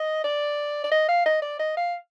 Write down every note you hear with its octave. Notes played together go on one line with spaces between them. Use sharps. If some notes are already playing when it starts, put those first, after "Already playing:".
Already playing: D#5
D5
D5
D#5
F5
D#5
D5
D#5
F5